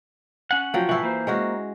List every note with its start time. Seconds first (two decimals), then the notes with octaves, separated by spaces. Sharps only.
0.51 C#4 F#5
0.74 F3 F#3 G5
0.89 A2 E3 E4 F#4
1.03 A#3 C5
1.27 G#3 C#4 F#4